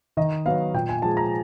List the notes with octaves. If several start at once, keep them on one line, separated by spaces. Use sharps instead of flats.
D#3 D#5
F#3 B3 F5
A#2 G5
G#5
F3 G#3 A5
A#5